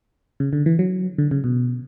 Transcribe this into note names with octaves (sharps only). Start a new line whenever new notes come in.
C#3
D3
E3
F#3
D3
C#3
B2